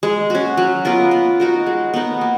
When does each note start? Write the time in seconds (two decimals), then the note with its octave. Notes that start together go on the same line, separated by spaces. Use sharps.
0.03 G#3
0.30 C#4 F#4
0.57 F#3
0.85 B3 F4 A#4
1.11 B3
1.40 D#4 F#4 A#4
1.66 G#3
1.94 B3 D#4 A#4
2.21 A#3